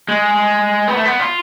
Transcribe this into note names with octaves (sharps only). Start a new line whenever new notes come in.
G#3
B3
A3
B3
F4